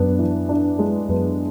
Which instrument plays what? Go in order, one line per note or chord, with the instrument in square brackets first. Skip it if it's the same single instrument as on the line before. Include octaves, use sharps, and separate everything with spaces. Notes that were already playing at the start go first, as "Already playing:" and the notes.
Already playing: [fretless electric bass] F#2 [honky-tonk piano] B3 D4
[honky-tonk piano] E3
D4
G#3
[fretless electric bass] F#2 [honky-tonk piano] B3